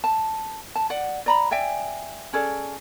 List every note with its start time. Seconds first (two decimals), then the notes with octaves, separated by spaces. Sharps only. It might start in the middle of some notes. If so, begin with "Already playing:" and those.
0.04 A5
0.75 A5
0.90 D5 F#5
1.26 D5 A#5 B5
1.51 D5 E5 G5 G#5
2.33 C#4 G#4 A4 D5